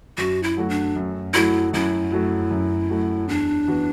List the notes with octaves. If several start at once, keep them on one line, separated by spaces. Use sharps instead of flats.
F#2 F#4
E4
F#3 A3 F#4
D4
F#2
F#3 A3 E4 F#4
F#2 E4
F#3 A3 F#4
F#2
F#3 A3 F#4
E2 D4
E3 B3 F#4